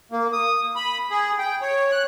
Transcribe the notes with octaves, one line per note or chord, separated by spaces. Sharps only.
A#3
D#6
B5
G#4
G5
C#5
F#6